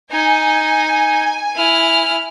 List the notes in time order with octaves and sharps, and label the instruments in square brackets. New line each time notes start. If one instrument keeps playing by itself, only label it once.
[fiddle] D#4 [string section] G#5
[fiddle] E4 F6